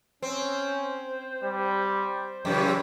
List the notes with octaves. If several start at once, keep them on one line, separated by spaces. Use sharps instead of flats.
C4 C#4 C5
G3
C5
F#2 C#3 E3 G4